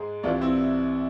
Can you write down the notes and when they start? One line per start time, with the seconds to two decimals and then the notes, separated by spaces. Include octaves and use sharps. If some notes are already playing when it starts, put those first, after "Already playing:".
Already playing: G#2 G#3 G#4
0.23 C2 C3 E3 D4 F4
0.41 C4 E4